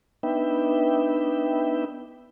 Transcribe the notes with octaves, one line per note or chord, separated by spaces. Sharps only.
B3 D4 D#4 B4 E5 G5